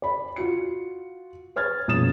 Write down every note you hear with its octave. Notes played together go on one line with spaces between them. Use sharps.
D5 B5
F4 F#4 C#7
B4 C#5 F6 G#6 A6
F#1 B2 F3 D#6 A6 E7